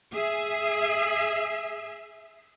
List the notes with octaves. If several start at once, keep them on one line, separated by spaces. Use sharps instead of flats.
G#4 E5